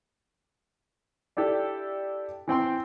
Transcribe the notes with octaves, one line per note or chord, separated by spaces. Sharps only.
D4 E4 G4 A4
E3 C4 G5 C6